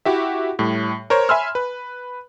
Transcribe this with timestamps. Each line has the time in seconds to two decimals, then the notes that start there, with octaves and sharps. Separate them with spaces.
0.05 E4 F#4 G4 E5
0.59 A2 G3
1.10 A#4 C5 C#5
1.29 E5 G#5 B5 C6 E6 F6
1.55 B4